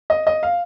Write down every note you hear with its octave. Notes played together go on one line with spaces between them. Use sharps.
D#5
D#5
F5